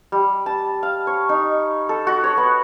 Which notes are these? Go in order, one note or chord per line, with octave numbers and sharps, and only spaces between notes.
G3
A5
F5
C#5
D#4
A4
F#4
C#5
B3